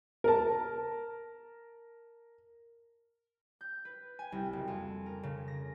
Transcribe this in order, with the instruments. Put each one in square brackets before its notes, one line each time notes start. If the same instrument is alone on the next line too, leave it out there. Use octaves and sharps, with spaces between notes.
[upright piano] A#4 A5
[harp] G6
B4
G#5
C2
F#1
F2
A#4
C#3
A#6